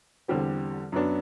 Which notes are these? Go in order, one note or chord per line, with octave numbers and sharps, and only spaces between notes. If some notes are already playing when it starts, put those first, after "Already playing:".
E2 D3 G3 C4
F#2 F#3 B3 D4